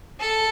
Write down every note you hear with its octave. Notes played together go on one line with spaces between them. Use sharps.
A4